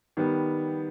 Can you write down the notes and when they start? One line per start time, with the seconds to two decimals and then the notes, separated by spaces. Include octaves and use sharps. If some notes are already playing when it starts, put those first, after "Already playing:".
0.17 D#3 G3 B3